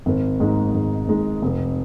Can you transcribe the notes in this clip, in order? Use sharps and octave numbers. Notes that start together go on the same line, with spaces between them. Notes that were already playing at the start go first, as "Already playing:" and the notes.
G#1
G#2 G#3 D#4
G#1
G#2 G#3 D#4
F1